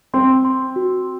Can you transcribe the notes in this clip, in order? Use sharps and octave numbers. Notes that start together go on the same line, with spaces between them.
C4 C6
C6
F#4